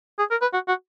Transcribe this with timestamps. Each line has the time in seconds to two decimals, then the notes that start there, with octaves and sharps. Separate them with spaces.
0.19 G#4
0.31 A#4
0.42 B4
0.53 F#4
0.68 F#4